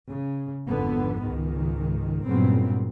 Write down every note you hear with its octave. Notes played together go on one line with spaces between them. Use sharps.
C#3
G#1 F2 D3 B3
C#2 G#2 D#3
G2 A#2 C#3 F#3 B3 C4